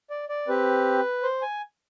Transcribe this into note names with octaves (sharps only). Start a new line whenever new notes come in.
D5
D5
C4 G4 B4
C5
G#5